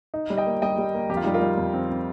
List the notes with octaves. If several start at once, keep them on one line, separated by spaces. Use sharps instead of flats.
D#4
G3
D#5 G5
A#3
G3 D#5 G5
G3
A#3
F2 G4
F4
G3 D#4 G4
F4 A#4
G3
F2
C4
C4